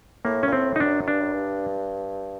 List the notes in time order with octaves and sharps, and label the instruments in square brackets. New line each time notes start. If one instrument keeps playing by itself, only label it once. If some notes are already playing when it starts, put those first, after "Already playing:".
[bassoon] A2 [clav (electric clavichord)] A#3
[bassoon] A#2 [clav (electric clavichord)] C#4
[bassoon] A2 [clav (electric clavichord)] C4
[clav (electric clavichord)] D#4
[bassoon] F#2 [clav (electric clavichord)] D4
[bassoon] G2 [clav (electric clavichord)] D4
[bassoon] F#2
G2